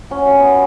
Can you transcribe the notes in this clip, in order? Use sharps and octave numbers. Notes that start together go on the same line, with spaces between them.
F#3 C#4
F#3 C#4
F#3 B3